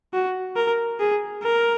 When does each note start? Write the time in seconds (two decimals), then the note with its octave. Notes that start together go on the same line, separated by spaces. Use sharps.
0.13 F#4
0.56 A#4
1.00 G#4
1.43 A#4